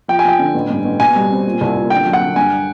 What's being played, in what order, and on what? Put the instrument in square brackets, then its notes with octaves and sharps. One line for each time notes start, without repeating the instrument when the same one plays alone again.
[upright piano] F3 [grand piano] G5
[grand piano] G#5
[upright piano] F3 [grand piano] G5
[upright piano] D3
A1
G2
A1
[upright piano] B2 [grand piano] G#5
[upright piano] G3
C4
A#2
C2
A#2
[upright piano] D3 [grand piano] G5
[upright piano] F#3
[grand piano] F#5
[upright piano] D3
[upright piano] G2 [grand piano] G#5